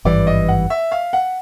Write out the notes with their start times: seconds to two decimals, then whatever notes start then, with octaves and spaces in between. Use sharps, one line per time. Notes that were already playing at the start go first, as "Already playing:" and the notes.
0.05 G#1 G2 E3 D5
0.27 D#5
0.48 F#5
0.70 E5
0.92 F5
1.13 F#5